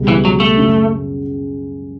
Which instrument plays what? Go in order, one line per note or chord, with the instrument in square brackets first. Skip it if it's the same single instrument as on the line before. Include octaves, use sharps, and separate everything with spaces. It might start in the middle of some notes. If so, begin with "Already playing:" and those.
Already playing: [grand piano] C#2 B2 G3
[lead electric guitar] E3
F#3
A3
[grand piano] F#2 C#3 F#3 C#4 F#4